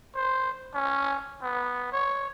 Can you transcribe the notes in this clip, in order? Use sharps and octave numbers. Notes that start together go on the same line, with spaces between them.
C5
C#4
B3
C#5